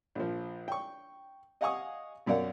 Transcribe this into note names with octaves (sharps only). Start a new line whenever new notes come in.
A#1 F3
G5 C#6
D#5 F5 F#5 G#5 C#6 D#6
B1 F#2 A#4 D5 F5 F#5